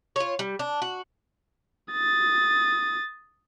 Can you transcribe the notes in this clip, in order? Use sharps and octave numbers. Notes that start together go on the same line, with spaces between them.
F4 C#5
G3
D4
F#4
D#6 A6